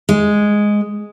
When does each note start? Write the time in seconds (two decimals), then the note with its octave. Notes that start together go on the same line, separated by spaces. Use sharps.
0.09 G#3